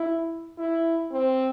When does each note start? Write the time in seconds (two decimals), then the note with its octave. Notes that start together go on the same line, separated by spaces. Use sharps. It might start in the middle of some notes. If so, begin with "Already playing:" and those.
Already playing: E4
0.58 E4
1.12 C4